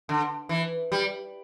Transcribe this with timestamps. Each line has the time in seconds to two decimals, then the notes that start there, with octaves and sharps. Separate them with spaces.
0.09 D3
0.49 E3
0.92 G3